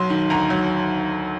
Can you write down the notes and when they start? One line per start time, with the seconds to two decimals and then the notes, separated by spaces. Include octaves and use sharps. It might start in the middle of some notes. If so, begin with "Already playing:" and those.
Already playing: B1 F#3 C6
0.10 D#3
0.30 D2 A#5
0.50 F#3